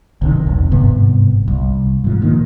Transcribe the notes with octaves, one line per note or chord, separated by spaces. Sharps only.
B1 C3 D#3
E1
G1 G#2 C3 B3
C2
G#2 F3
A#2 D#3